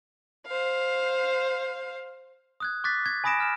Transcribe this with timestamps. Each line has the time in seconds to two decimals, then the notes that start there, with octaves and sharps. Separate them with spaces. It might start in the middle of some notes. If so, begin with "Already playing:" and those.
0.47 C5 F5
2.60 D#6 F#6 G#6
2.84 C#6 D6 F#6 G#6 A6 B6
3.06 G#6
3.24 G#5 B5 D#6 A#6 D7 E7
3.40 F6 E7